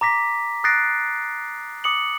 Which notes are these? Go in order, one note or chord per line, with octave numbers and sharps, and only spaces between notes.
A#5 D6 A#6 B6
D#6 F#6 A6 A#6 C7 D7
D6 D#6 C#7 F#7